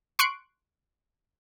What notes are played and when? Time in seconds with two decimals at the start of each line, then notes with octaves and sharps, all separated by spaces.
0.19 C6 C#6 F#6 C#7 D7